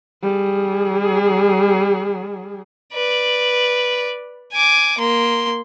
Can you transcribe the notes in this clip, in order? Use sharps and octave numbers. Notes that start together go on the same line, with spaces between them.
G3 G#4
B4 D5
G#5 D6
A#3 C6